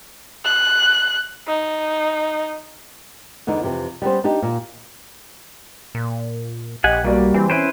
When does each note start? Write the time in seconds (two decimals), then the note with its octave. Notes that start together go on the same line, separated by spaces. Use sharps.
0.44 F#6
1.47 D#4
3.47 E2 D3 B3 D#4
3.61 F2 C3 E3
4.02 G3 B3 C#4 C5
4.24 D4 D#4 G4
4.42 A#2
5.95 A#2
6.84 A#1 G4 D#5 F#5 G#5
7.04 B1 G3 A#3 F#4 D5
7.34 E3 C4
7.50 C#4 E4 B4 C5 D7